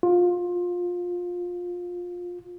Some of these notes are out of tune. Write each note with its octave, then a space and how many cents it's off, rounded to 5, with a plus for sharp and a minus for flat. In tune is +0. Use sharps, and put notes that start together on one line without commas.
F4 +20